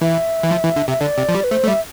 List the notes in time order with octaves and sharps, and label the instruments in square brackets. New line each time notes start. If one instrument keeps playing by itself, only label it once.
[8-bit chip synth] E3 [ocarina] E5
[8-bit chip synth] E3
F3
E3
D3
[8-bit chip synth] C3 [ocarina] E5
[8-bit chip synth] D3 [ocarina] D5
[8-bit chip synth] C3
F3
G3
[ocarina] B4
[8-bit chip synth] A3 [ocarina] C5
[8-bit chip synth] A3
[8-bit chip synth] G3 [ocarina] E5